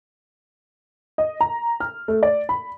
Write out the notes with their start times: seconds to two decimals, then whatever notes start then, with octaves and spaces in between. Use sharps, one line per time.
1.18 D#5
1.41 A#5
1.80 F6
2.08 A3
2.23 D5
2.49 B5